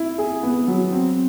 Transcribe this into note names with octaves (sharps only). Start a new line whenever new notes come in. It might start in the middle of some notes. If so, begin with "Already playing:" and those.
Already playing: E4
G#4
B3
F#3
C4